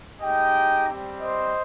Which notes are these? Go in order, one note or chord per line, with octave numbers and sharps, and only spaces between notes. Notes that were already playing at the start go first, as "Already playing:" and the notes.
G#3 D#4 G4 D#5 G5
G3 C4 G4
C5 D#5